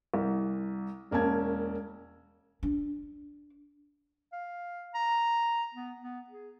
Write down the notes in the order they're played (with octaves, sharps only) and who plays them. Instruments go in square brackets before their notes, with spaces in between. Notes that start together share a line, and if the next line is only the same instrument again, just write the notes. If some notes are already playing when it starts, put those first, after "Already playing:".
[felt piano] C2
E1 A#3 C#4 A5 G#6
[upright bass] D4
[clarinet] F5
A#5
B3
B3
G#4